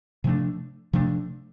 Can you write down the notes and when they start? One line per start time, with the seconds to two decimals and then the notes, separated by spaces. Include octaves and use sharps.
0.24 C3 F3 A3 D4
0.93 C3 F3 A3 D4